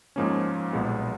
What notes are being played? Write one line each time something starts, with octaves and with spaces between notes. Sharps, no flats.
G#2 F3 A#3 C#4
B1 A#2 G#3 B3